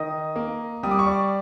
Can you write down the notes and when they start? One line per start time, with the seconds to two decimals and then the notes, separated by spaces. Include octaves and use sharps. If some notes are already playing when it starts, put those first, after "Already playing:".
Already playing: D#3 D#5 D#6
0.36 A#3
0.83 G3 D#6
0.91 D6
0.99 C#6
1.07 D5 D6